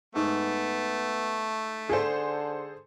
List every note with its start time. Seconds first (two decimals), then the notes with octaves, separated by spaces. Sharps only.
0.15 G#2 A3 B3
1.89 D3 G#4 A4 C5